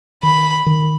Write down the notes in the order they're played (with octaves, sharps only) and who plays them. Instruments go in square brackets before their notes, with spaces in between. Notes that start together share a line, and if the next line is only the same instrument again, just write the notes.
[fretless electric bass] D#3 [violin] B5
[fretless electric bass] D#3